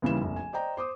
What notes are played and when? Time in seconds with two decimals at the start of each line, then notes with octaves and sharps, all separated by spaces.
0.02 D#2 C#3 E3 G3 B4 E7
0.21 F1 A#1
0.36 G#5
0.53 C5 D5 D#5 G5 A#5
0.77 C5 D6 D#6